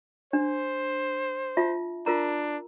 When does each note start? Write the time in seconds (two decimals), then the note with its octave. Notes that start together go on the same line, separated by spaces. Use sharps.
0.33 D4 C5
1.57 F4 E5 A5
2.06 D4 F4 A#4 A#5